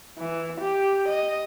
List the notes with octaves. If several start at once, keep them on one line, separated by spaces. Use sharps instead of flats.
E3
G4
D#5